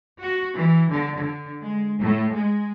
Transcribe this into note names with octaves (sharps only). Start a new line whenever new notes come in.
F#4
E3
D3
D3
G#3
A2
G#3